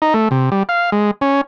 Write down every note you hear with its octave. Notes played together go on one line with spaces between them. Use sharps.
D#4
A3
C3
G3
F5
G#3
C#4